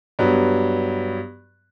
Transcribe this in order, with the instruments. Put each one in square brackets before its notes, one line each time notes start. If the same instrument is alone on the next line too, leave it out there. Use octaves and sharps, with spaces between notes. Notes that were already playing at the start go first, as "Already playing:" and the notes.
[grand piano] G2 F#3 B3